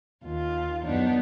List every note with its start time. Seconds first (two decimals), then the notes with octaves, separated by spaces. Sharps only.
0.24 D#2 F4
0.84 F#2 B3 D4 D#4